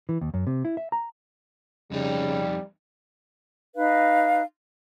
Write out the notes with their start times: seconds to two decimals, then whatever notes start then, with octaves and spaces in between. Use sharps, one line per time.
0.09 E3
0.21 D#2
0.34 F#2
0.47 C3
0.65 E4
0.77 E5
0.92 A#5
1.92 F2 C#3 G3 D#4
3.75 D#4 B4 F5